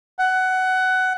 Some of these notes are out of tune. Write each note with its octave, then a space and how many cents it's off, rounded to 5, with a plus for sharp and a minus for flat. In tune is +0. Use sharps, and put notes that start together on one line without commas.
F#5 +15